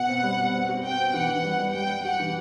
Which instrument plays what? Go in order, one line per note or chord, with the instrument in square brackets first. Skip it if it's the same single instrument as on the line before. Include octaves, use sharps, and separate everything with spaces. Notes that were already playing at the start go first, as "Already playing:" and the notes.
Already playing: [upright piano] B2 [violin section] F#5
[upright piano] C4
G3
B2
C4
F#4
[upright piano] C4 [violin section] G5
[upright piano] C4
[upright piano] E3 [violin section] F#5
[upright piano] E3
G3
G3
[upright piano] G3 [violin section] G5
[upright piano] G3
[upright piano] F#4 [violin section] F#5
[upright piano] E3